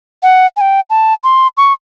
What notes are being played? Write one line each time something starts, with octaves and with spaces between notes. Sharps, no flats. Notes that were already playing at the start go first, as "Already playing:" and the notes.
F#5
G#5
G5
A5
C6
C#6